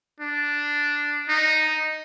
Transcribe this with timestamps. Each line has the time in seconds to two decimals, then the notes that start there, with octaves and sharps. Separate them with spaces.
0.20 D4
1.29 D#4